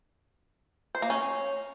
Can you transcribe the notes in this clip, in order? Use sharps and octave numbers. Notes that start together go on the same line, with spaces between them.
C5
A#3
C#4